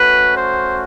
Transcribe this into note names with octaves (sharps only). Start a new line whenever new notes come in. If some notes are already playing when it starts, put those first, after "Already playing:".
Already playing: A3 C#4 F#4 B4
C5